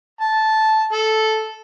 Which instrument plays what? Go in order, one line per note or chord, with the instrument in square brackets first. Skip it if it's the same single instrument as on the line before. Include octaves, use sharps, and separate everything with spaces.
[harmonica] A5
A4